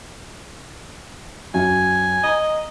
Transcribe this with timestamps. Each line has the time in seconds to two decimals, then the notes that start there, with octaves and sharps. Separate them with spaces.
1.54 F#2 G#5
2.23 D#5 A#5